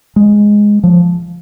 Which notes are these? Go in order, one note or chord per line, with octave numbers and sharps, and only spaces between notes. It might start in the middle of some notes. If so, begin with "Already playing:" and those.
G#3
F3